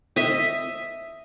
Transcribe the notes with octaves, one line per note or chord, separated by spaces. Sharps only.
D#5 E5